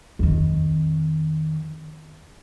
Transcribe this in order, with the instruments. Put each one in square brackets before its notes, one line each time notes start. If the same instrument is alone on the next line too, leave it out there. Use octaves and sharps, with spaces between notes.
[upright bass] F2 D#3